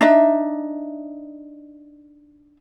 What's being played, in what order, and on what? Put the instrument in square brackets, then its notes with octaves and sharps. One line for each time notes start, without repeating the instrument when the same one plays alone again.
[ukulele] D4 D#4 E5